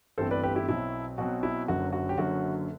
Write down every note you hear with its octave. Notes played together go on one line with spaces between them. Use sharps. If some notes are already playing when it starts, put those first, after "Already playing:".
G1 G2 E3 A3 C4 A4 C5
B4 D5
G4 B4
E4 G4
B1 B2 F#3 C4 E4
B1 B2 F#3 C4 F#4
E4
F#1 F#2 D3 F#3 F#4
F#4
G4
F#1 F#2 D3 F#3 F#4